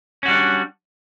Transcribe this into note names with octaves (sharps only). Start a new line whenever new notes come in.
G3 C#4 D4 F#4